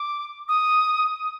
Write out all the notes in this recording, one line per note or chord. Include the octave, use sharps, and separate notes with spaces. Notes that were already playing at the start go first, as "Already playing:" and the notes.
Already playing: D6
D#6